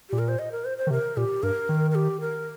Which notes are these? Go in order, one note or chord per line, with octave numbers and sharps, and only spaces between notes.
A#2 G4
A#4
C5
D#5
A#4
C5
C5
D#3
C3 A#4
A#2 G4
G2 A#4
D#3
A#4
G4
A#4